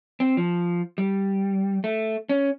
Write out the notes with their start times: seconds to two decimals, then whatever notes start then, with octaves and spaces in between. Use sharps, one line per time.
0.20 C4
0.37 F3
0.98 G3
1.84 A3
2.29 C#4